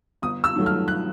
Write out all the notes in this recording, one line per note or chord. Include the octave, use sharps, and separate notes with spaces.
G1 D#6
E6
G2 D#3 F#3 A3
F6
F#6